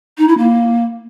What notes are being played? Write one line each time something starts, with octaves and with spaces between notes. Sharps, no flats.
D#4
E4
A#3